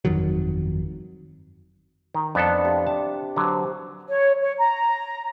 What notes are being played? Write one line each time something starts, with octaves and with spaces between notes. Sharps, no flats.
G1 F2 D#3 F#3
D#3
F2 B3 D4 A4
C3
A5
D3 F#3 C5
C#5
C#5
A#5